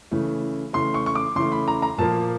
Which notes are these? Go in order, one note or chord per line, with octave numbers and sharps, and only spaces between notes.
C#3 E3 A3
C#3 E3 A3 C6
C#6
C#6
D6
C#3 E3 A3 C6
B5
A#5
A#5
A#2 F3 A#3 A5